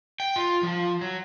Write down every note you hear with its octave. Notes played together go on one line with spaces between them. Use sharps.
G5
F4
F3
F#3